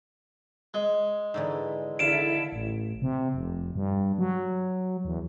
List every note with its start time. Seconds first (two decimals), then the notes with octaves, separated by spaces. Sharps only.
0.74 G#3
1.34 G#2 D3 E3
1.99 D3 D#3 E4 A4 F5 D7 E7
2.52 A1
3.02 C3
3.34 F1
3.75 G2
4.18 F#3
5.05 E2